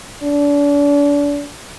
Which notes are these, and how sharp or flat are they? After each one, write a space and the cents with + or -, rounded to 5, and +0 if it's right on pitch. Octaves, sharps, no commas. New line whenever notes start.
D4 -35